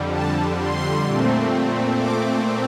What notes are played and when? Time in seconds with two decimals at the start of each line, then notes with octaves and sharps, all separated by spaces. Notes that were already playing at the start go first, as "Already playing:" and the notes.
Already playing: F2 D3 G3
0.12 A5
0.57 C6
1.04 A#2 A3 C4
1.98 D6